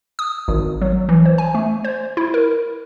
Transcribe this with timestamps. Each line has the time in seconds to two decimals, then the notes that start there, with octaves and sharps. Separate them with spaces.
0.19 D#6
0.48 G#1
0.81 F#3
1.09 E3
1.25 C5
1.38 G#5
1.55 A3
1.84 C5
2.17 E4
2.34 A#4